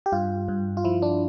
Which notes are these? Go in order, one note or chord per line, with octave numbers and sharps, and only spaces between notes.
G4
G2 F4
G2
F4
F3 E4
D4